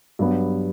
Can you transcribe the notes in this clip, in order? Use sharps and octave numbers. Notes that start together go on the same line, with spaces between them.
G2 F#3 B3